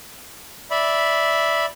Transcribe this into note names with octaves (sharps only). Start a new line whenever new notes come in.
D5 E5 B5